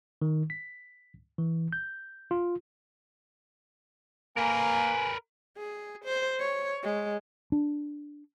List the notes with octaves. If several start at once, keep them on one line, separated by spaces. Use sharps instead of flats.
D#3
B6
E3
G6
F4
A#3 A#4 B4 G#5
G#4
C5
C#5
G#3
D4